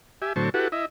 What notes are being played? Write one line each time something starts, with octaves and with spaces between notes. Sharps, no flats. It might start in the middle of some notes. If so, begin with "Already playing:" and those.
G4 E5 G#5
A2 D3 F#3 C5 A5 C#6
E4 F#4 G4 A4 B4 F#5
E4 D#5 E5